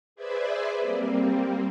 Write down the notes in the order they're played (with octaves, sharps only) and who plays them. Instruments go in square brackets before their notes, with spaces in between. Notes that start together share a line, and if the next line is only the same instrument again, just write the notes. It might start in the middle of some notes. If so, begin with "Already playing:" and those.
[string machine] G#4 B4 C5 D5 E5 G#5
G3 A#3 C4